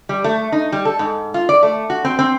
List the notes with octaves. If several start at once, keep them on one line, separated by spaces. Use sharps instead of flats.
G3
A3
D#4
G3
A4
G#2
F4
D5
A3
F#4
C4
C4